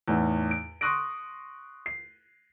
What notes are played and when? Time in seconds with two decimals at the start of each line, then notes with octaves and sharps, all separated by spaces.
0.08 E2 A2 D#4
0.51 D7
0.81 C6 C#6 D#6 F#6 A#6 D7
1.86 C7